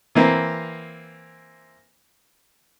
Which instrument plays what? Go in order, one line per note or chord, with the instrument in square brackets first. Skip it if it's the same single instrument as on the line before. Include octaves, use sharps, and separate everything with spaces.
[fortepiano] E3 A#3 C4